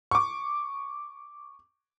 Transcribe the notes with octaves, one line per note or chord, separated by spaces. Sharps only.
C#6 D6